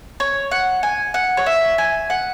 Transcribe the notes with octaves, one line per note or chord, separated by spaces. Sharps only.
C#5
F#5
G#5
F#5
C#5
E5
G#5
F#5